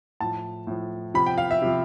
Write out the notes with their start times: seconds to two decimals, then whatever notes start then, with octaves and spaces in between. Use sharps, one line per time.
0.20 A2 F3 A5
0.67 A2 F3
1.14 C3 F3 B5
1.26 G5
1.38 F5
1.51 E5
1.62 C3 F3